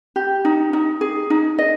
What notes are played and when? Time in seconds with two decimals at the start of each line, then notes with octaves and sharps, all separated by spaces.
0.16 G4
0.45 D#4
0.73 D#4
1.01 G#4
1.30 D#4
1.58 D#5